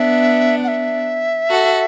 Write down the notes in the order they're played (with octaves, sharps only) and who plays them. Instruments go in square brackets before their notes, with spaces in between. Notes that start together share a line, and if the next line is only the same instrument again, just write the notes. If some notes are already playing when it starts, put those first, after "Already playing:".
Already playing: [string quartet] B3 D4 [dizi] E5
[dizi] F#5
E5
[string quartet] F#4 A4